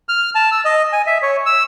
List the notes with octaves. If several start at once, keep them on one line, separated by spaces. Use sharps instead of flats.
F6
A5
E6
D#5
G#5
E5
C#5
E6